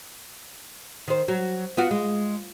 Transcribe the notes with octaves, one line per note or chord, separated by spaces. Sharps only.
D#3 C5
F#3
B3 F4 F#4
G#3